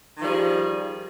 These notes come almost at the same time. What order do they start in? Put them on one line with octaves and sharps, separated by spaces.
D#3 F3 G3 G#4